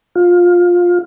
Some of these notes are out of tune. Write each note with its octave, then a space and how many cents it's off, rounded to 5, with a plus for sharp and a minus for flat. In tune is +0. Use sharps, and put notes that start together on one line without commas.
F4 +15